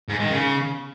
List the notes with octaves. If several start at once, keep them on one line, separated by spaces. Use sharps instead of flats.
G#2
D#3
C#3